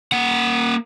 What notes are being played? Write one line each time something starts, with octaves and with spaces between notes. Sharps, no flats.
A#3 F#5